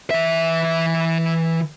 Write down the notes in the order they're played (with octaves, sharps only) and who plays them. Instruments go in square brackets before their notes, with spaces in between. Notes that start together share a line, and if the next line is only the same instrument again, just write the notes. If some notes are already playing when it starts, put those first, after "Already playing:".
[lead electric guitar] E3 E5